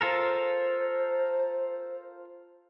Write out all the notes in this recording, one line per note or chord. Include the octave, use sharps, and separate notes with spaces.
F4 A4 A#4 C5